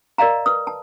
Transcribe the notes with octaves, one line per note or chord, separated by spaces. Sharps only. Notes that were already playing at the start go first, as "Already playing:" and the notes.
A#4 D5 D#5 F5 A#5
B4 D#6
A5